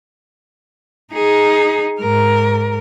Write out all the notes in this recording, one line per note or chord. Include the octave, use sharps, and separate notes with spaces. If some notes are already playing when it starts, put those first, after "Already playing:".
D#4 G#4
G#2 A#4